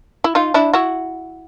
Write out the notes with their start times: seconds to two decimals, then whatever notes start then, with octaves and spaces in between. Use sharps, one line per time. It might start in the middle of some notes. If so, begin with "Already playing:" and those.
0.24 E4
0.35 D#4 F4
0.54 D4 E4
0.73 E4 F#4